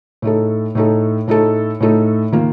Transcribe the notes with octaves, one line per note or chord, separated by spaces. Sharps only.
A2 A3 D#4 A4
A2 A3 D#4 A4
A2 A3 D#4 A4
A2 A3 D#4 A4
D#3 A#3 F4